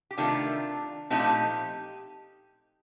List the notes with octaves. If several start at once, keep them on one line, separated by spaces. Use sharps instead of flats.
G4
C3 D#3 A3 D4 F4
A#2 F3 A3 C4 D#4 G4